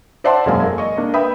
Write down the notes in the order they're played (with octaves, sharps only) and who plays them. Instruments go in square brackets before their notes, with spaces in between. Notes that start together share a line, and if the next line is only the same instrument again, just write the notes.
[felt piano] C5 D5 E5 F#5 A5 C6
E1 F#2 A#3 C#5 F5 G#5
A4 A#4
D#5 C#6
A#3 D4
B4 E5 G5 B5 D#6